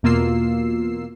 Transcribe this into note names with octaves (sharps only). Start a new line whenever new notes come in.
E2 B2 A#3 F4 E6 C7